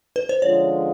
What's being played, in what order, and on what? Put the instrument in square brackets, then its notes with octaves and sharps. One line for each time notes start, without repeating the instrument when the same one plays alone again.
[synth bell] B4
C5
[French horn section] D3 F3 G#3 C#4 F4 [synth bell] C#5